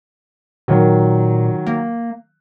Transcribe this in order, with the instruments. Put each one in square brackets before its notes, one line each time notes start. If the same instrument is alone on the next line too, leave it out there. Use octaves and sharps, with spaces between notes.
[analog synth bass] A#2 [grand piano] D#3 F#3
[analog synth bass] A#3